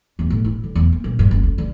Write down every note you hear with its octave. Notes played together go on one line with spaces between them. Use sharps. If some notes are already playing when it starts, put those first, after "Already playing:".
E2
A2
E4
D3
E2
A#3
A#1
G2
F#1
D2
D3